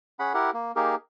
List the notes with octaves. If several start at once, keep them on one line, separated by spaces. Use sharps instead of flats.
C#4 G#4 F#5 B5
E4 G4 A#4 F#5
A#3
A#3 D#4 G4 G#4 A#4